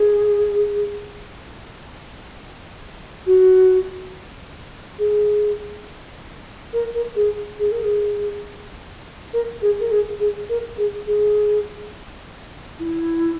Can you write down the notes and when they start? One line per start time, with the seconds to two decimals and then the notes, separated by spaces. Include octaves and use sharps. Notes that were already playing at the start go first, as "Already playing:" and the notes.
Already playing: G#4
3.26 F#4
4.99 G#4
6.73 A#4
6.94 A#4
7.16 G#4
7.59 G#4
7.72 A#4
7.83 G#4
9.33 A#4
9.62 G#4
9.80 A#4
9.91 G#4
10.20 G#4
10.49 A#4
10.78 G#4
11.07 G#4
12.80 E4